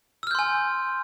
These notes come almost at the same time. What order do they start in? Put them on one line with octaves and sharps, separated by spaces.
E6 F6 G6 C6 G#5